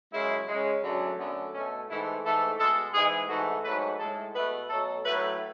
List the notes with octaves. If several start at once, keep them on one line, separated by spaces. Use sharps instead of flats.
F#2 C#3 G#3 E4
C#3 G#3
F#2 D3 F#3 A3
F#2 D3 A3 B3
B2 C#4
A3
G#2 E3 A3 E4
G#2 E3 A3 A4
B2 G#3 A4
G#2 E3 G#3 G#4
G#2 E3 A3 F#4
G#2 F#3 A3 B4
A2 G#3 A4
B2 A3 B4
B2 F#3 A3 A4
A2 F#3 A3 B4